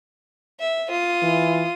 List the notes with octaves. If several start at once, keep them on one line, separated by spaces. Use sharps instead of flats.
E5
F4 D#6
E3